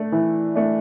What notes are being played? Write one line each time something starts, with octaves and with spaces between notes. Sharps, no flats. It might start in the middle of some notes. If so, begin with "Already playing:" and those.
Already playing: A3 D4
E3
A3 D4